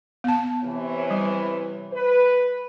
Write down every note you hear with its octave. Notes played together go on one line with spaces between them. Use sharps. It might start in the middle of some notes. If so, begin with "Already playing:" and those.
B3 A5
C3 E3 C#5
G3
B4